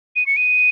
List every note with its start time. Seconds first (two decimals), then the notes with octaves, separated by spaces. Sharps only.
0.16 D#7
0.26 C#7
0.37 D#7